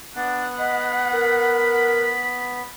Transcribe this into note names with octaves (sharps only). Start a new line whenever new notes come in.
B3 D4 F#5
D#5 B5
A#4